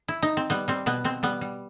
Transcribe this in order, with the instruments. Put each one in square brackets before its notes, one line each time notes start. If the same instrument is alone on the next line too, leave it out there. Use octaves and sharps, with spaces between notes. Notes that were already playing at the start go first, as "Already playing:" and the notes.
Already playing: [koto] F#4
E4
D#4
C4
G3 B3
G3 C4
B2 B3
B2 C4
G3 B3
G3